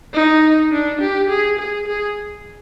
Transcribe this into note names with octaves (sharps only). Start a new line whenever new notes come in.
D#4
D4
G4
G#4
G#4
G#4